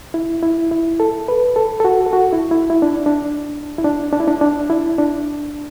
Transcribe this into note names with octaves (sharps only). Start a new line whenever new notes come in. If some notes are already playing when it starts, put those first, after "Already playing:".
E4
E4
E4
A4
B4
A4
A4
F#4
A4
F#4
E4
E4
E4
D4
D4
E4
D4
D4
E4
D4
D4
E4
D4